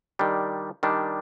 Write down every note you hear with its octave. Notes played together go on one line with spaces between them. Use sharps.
D#3 G3 D4
D#3 G3 D4